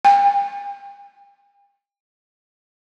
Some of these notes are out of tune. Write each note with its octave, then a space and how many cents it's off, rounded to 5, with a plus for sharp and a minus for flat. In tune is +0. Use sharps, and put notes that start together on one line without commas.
G5 +45